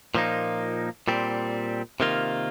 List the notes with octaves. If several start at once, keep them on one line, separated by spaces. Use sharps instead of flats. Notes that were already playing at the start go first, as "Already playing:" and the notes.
A#2 F3 A#3 D#4
A#2 G3 C4
C3 D#3 A#3 F4